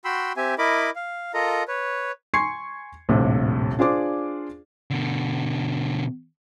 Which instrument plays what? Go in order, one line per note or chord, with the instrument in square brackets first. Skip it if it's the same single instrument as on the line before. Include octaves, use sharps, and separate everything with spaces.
[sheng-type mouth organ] F#4 G5 B5 C6 E6
C4 G4 E5 G#5
E4 A#4 D#5 B5 D6
F5
F4 A4 A#4 D#5 A#5
B4 C#5
[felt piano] G#5 C6 C#6 G#6 C7 C#7
D#1 A#1 A2 C3
D4 F4 G#4 C5 D5 D6
[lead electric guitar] B2 D3